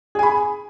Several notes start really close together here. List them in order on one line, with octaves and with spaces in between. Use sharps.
G#4 G#5 B5